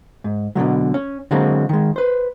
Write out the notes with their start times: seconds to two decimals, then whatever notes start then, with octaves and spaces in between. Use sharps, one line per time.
0.24 G#2
0.55 B2 D3 F3 F#3
0.94 C#4
1.31 D3 F#3 G#3 A#3 C4
1.69 D#3 G#3
1.96 B4 C5